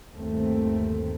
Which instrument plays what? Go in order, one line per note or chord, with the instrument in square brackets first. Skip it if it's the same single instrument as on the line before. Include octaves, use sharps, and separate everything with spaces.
[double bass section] G1 D#2 A3 C4